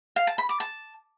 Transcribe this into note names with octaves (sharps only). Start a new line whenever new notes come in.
F5
A5
B5
D6
A5